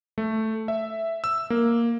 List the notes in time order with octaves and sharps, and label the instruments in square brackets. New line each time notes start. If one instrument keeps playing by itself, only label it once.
[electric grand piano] A3
E5
E6
A#3